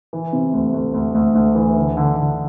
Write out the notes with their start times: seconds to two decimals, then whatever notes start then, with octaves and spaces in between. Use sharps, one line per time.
0.13 E3
0.33 C3
0.53 D2
0.74 D2
0.94 D2
1.15 D2
1.35 D2
1.55 E3
1.76 D3
1.97 D3
2.17 D3